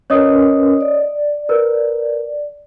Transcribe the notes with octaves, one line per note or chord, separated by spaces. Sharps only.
C#4 A#4 B4 C#5 D#5 D#6
D5
A#4 B4